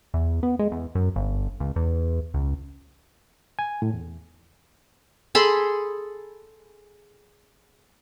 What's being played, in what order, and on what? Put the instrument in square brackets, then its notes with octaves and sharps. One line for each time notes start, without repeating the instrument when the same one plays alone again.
[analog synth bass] E2
B3
G#3
E2
F#2
G1
C#2
E2
C#2
[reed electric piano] G#5
A2
E2
[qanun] G#4 A4 B5 C6